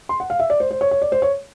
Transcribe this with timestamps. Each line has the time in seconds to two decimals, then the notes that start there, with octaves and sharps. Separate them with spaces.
0.09 C6
0.20 F#5
0.30 F5
0.40 E5
0.50 D5
0.60 C5
0.71 C5
0.81 C#5
0.91 C#5
1.02 D5
1.12 C5
1.22 C#5